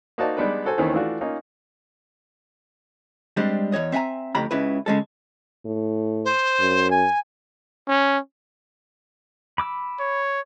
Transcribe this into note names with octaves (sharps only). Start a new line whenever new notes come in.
A#3 D#4 F#4 C5 D5 A5
G3 G#3 B3 D4 D#4 B4
F#4 A4 C5 G#5
D#2 D#3 E3 C4 C#4
E3 A3 D4 F4 F#4
A#3 C#4 D#4 F4
G3 G#3 C4 D4 G4
E2 E3 C#5 D#5
C4 E5 F#5 G#5 A#5
F2 A2 C#3 G4 A#5 B5
C#2 C#3 E4 B4
C#3 G#3 A4
A2
C5
F#2
G#5
C#4
B5 D6 E6
C#5